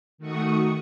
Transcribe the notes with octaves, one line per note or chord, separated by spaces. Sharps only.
D#3 A3 F#4 C#6 D#6 C#7